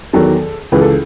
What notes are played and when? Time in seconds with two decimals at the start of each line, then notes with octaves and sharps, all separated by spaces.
0.13 E2 D#3 F#3 A4
0.72 C#2 C#3 E3 B4
0.81 A4